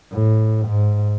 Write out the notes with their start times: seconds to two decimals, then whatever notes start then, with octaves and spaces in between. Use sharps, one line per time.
0.12 A2
0.67 G#2